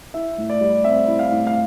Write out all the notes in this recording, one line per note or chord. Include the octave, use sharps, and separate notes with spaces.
E4 E5
A2
D5
G3
C4 E5
E4
F5
A2
F5